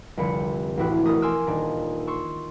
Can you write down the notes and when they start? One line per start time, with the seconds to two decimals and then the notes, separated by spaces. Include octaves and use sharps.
0.17 F1 C2 D3 B5 C#7
0.77 A1 D2 A2 E3 E4 F#4
1.05 E1 A3 A#4 D#6
1.22 G#5 C6 D6 E6 F6
1.47 D#1 D4 D#4
2.07 C6 C#6 E6